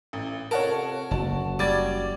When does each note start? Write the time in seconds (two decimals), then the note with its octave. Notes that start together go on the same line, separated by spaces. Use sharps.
0.13 A1
0.51 C3 F4 A4 A#4 C#5 F#5 A5
1.11 F#1 F#4 A5
1.59 G3 D6 G#6 A6